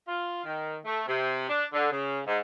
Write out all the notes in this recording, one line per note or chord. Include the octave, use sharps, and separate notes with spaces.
F4
D#3
A3
C3
D4
D3
C#3
G#2